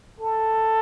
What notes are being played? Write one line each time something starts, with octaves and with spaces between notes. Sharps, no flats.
A4